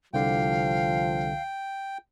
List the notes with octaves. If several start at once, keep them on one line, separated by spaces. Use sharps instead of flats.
C2 D3 F3 F5 G5